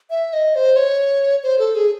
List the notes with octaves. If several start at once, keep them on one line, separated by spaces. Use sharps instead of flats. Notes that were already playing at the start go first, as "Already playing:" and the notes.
E5
D#5
C5
C#5
C5
A4
G#4